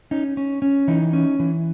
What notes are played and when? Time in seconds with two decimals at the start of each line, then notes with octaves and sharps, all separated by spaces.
0.11 C#4 D#4
0.37 C#4
0.62 C#4
0.88 E3 D#4
1.13 C#4
1.40 E3